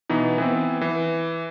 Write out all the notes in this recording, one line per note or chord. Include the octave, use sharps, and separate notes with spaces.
B2 E3 B3 D#4
E3 B3 C4
E3